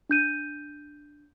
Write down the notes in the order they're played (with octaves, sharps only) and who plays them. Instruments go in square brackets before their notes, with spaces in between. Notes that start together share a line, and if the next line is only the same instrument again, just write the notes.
[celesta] D4 G6 D#7